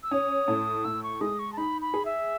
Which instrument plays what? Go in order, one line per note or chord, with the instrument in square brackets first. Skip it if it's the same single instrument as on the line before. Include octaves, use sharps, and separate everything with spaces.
[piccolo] E6
[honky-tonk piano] C#4 [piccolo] D#6
[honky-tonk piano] A2
[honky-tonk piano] A2 [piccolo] E6
[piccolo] C#6
[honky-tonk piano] G#3 [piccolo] D#6
[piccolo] C#6
A5
[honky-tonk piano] D#4 [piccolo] B5
[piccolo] B5
[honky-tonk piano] G#4
[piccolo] E5